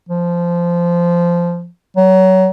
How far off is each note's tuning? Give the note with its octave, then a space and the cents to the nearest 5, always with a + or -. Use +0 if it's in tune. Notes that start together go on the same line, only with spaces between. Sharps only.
F3 -15
F#3 +25